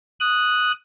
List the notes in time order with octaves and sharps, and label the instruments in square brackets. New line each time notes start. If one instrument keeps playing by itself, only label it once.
[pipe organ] D#6 F#6